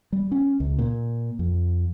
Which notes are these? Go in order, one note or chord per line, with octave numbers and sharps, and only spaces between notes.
G3
C#4
C#2
A#2
F2